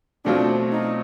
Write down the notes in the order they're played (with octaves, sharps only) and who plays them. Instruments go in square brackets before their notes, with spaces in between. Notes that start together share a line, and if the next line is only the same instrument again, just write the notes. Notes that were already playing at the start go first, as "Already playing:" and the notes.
[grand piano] B2 F#3 A3 C4 F4 [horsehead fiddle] D4
[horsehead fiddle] D#4